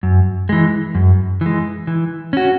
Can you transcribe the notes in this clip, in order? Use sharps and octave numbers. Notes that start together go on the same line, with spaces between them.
F#2
E3 G#3
F#2
E3 G#3
E3
C#4 F#4